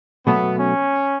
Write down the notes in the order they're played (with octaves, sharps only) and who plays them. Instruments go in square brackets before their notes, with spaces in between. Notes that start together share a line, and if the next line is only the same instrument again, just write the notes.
[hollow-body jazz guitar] B2 F#3 A3 [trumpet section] B3
[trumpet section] C#4